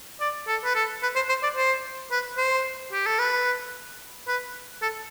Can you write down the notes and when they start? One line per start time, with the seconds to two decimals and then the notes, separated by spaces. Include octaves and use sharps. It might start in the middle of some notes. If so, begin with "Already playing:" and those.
0.20 D5
0.47 A4
0.64 B4
0.75 A4
1.03 B4
1.15 C5
1.29 C5
1.43 D5
1.56 C5
2.11 B4
2.37 C5
2.92 G4
3.06 A4
3.19 B4
4.28 B4
4.82 A4